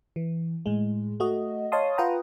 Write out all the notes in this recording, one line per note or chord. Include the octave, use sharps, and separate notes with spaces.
E3
A2 G#3
A3 F#4 D#5
C#5 D#5 F5 A5 C6 D#6
F4 B4 F#5 G5 A#5 D#6